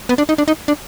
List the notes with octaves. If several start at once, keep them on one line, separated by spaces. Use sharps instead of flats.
B3
D4
D#4
D4
D#4
D4